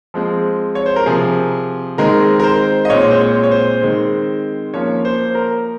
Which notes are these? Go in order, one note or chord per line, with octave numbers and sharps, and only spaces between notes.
F3 G#3 C4
C#5
C5
A#4
C3 F3 C4 G#4
D#3 G#3 C4 A#4
A#4
C5
D#5
A#2 G#3 C4 C#5
C5
C#5
C#5
C5
D#3 G#3 C4
F3 A#3 C#4 C#5
C5
A#4